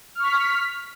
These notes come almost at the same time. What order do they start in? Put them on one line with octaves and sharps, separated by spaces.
F6 C#6 B6